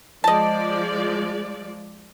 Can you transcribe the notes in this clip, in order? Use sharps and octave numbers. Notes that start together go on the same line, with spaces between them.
F3 G#3 D5 D#5 A5